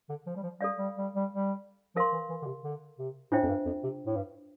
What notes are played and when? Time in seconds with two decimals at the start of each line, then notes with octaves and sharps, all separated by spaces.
0.09 D3
0.27 F3
0.36 G3
0.43 F3
0.60 G3 A4 D5 F5
0.78 G3
0.98 G3
1.15 G3
1.34 G3
1.95 F3 A#4 F5 C6
2.13 E3
2.30 E3
2.42 D3
2.46 C3
2.64 D3
2.98 C3
3.32 A2 D4 F4 C5 E5 G5
3.43 F2
3.49 G2
3.66 F2
3.83 C3
4.06 A2
4.16 G2